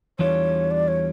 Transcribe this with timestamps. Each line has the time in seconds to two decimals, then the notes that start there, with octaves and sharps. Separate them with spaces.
0.19 E2 E3 G3 D4 F4 C#5
0.71 D5
0.88 C#5